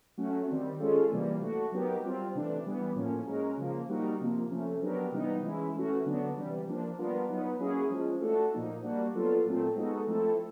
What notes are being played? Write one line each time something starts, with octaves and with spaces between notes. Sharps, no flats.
F#3 A3 C#4 F#4
D#3 G3 C4
G#3 C#4 F4 A4
C3 E3 G3 A#3
A3 D4 F#4
F#3 B3 D#4 G4 A#4
G3 C4 F4
C3 E3 A3 D4
E3 G3 B3
A2 F3 A#3 C#4
G#3 C#4 F#4 A#4
C#3 F3 A#3
G3 A#3 D#4 F#4 A#4
C3 F3 A#3
C3 F3 A3 C#4
F#3 B3 D4 G4 A#4
C3 E3 G3 B3 D#4
E3 G#3 C#4 E4
E3 A3 C#4 F#4
D3 F#3 B3 D4 F#4
C3 E3 G3
F3 A#3 D4
G3 B3 D4 F4 A#4
F#3 B3 D#4
F#3 A#3 C#4 E4 G#4
F3 G#3 C#4
A3 D4 F#4 A4
A#2 F3 A#3 D#4
G3 A#3 D4 F#4
F#3 B3 D4 F4 A4
A#2 F#3 A3 C4
G#3 B3 D#4 F#4 A4
F3 A3 C4 E4 A4